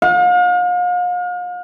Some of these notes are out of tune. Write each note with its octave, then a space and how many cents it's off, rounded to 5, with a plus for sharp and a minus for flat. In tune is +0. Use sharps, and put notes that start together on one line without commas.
F5 +40